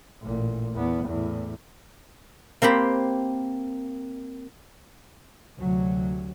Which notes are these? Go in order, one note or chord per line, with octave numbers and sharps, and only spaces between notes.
A1 A#2
E2 B3
E2 A2
A#3 C4 G4 B5
D2 C3 F#3